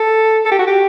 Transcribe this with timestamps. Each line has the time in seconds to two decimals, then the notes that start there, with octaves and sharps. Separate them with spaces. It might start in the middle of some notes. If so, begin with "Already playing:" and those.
Already playing: A4
0.45 A4
0.52 G4
0.59 F#4
0.67 G4